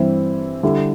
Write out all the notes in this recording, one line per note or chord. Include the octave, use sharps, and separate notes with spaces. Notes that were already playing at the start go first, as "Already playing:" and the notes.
Already playing: G2 E3 C4 E4
D3 G3 E4